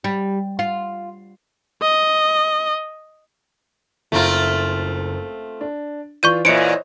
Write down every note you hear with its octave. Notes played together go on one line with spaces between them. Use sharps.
G3
F4
D#5
F#1 A3 C4 F4 A#5
D4
E3 F4 D5 C#6 G6 D#7
A#2 E3 C5 C#5 D#5 C#7 D7